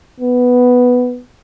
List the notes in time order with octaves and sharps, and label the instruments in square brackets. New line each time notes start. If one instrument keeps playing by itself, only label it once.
[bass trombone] B3